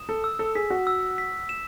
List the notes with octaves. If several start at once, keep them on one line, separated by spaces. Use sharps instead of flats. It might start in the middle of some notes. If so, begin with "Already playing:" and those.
Already playing: D#6 E7
A4
E6
A4
G#4 B6
F#4
E6
B6
E7